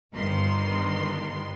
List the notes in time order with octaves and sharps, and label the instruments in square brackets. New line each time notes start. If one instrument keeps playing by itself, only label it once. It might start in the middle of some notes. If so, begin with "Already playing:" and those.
[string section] G1 G2 D#3 B3 C6